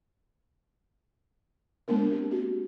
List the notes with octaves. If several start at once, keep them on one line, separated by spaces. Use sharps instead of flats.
G#3 A#3 B3 D4 A#4
C4 G4
F#4 G4